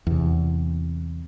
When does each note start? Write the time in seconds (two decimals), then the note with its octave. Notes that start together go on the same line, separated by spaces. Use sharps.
0.07 E2 C3